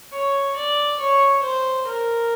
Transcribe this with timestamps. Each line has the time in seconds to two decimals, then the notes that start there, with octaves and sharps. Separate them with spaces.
0.13 C#5
0.56 D5
1.00 C#5
1.43 C5
1.87 A#4